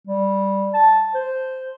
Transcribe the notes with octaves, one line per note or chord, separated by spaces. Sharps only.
G3
A5
C5